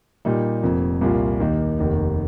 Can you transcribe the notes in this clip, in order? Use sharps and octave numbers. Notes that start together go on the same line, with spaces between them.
A#2 G3 A#3 D#4
F1 F2 F3 A#3
C2 A#2 A#3 F4
D#2 D#3 A#3 D#4
F1 D#2 D#3 A#3